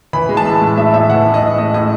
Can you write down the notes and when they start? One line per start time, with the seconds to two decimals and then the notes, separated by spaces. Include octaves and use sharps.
0.13 E3 B5
0.29 G#3
0.37 A5
0.45 A2
0.61 A2
0.77 G#3 E5
0.94 A2 E5
1.10 E3 F#5
1.26 A2
1.34 D#5
1.42 A2
1.58 A2 D#5
1.74 A2 D#5